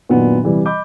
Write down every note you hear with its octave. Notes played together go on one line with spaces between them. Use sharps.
F#2 A#2 D#3 F#3 B3 D4
C3 E3 G3
D#5 B5 D6 G6